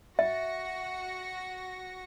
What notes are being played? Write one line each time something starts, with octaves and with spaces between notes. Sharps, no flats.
F#4 E5 A#6 C#7